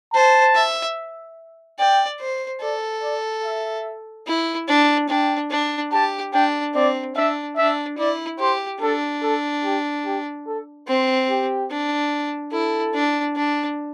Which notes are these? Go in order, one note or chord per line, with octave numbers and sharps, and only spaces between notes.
C5 A5
E5
D5 G5
C5
A4 D5
D5
E5
E4
D4
D4 G5
D4
G4 A5
D4 G5
C4 D5
D4 E5
D4 E5
E4 D5
G4 C5
D4 A4
A4
G4
G4
A4
C4 C5
G4
D4
E4 A4
D4
D4